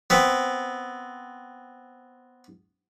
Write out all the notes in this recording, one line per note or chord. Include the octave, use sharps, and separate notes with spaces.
B3 C4